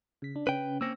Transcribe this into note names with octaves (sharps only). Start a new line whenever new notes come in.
C#3 B6
D4
C#3 C#4 B4 G5
A#3 C4 C#4 E6 A#6